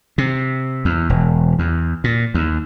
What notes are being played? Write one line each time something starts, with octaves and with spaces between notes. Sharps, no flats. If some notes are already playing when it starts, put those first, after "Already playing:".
C3
E2
E1
E2
A#2
D#2